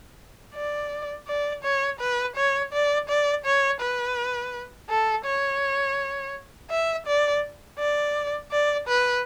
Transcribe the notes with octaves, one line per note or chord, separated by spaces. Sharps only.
D5
D5
C#5
B4
C#5
D5
D5
C#5
B4
A4
C#5
E5
D5
D5
D5
B4